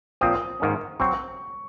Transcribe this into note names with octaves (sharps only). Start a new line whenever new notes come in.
A#2 F3 C4 D#6
G#2 D#3 A#3 C#4
F#3 C4 C#6